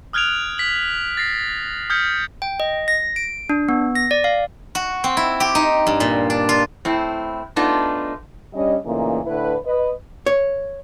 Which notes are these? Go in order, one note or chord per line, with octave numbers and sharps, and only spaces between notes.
D#6 F6 F#6 G#6 D7 F7
B6 F#7
A6 A#6 C7
D#6 F6 G6 G#6 B6 C#7
G5
D#5
A#6
D7
D4
B3
A#6
D5
F5
F#4
C4
E4
G4
D#4
G2
A#2
D4
F4
A2 C4 E4
A3 B3 D4 D#4 F4
G3 C#4 D4 D#5
A#2 C#3 E3 A3 A#3 D#4
A2 D3 E4 B4
B4 D#5
C#5